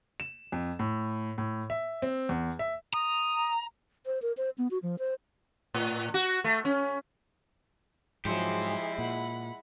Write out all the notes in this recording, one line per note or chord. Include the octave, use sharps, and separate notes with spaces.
E7
F2
A2
A2
E5
C4
E2
E5
A#5 D#6
C5
A#4
C5
B3
F#4
F3
C5
A2
F#4
A3
C#4
G#2 F3 F#3 G#3 E4 G4 G#4 C5
A#2 F#5 B5